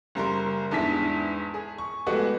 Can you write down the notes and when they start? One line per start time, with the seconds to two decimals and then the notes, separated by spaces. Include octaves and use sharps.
0.15 F#1 G3 A#4 C6
0.71 E2 G#2 D4 E4 B6
1.54 G#4
1.78 C#6
2.06 E3 G#3 A3 B3 F#4 G4